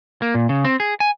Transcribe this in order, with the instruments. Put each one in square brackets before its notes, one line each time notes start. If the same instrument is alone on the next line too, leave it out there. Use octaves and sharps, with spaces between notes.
[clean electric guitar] A#3
A#2
C#3
C4
G#4
G#5